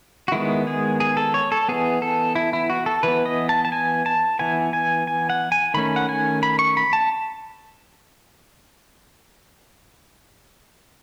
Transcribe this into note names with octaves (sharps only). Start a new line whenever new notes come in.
F#4
D#3 G#3 B3 E4
G#4
G#4
A4
C#5
A4
E3 B3 G#4
A4
E4
E4
F#4
A4
E3 B3 B4
D#5
A5
A5
G#5
A5
E3 B3 G#5
G#5
G#5
F#5
G#5
D#3 A3 C#4 B5
F#5
G#5
B5
C#6
B5
A5